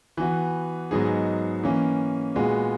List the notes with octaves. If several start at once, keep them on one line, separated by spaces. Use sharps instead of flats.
E3 B3 F#4
G#2 F#3 B3 D#4 G#4
E3 A#3 C#4
A#2 G#3 B3 F#4